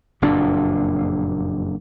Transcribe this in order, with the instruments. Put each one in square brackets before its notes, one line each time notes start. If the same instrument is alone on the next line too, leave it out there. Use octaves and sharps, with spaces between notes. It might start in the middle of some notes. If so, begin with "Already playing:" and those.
[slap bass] F#1 F2 A#2 D4